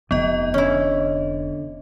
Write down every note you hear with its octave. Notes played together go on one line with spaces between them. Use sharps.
F1 F2 B3 D#4 G4 D#5
D3 C#4 E4